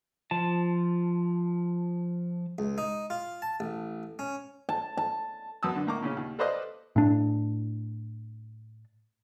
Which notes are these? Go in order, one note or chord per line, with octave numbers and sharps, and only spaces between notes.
F3 A5
C#2
D#4
F4
A5
A1
C#4
A5
A5
F#2 B3 A5 D#6 E6
D3
A2 A#3 A#5 C#6 D6
A#2 C#3 C#4
D#2
A4 B4 C5 D5 D#5 F5
A2 D4